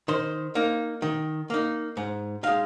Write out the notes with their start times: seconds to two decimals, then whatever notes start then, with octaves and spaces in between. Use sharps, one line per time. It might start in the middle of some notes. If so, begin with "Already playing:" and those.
0.08 D#3 C5
0.55 A#3 D#4
1.02 D#3
1.50 A#3 D#4
1.97 G#2
2.43 G#3 D#4 F5